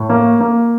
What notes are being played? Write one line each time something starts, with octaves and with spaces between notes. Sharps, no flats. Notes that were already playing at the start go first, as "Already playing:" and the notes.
Already playing: A2
A#3
A#3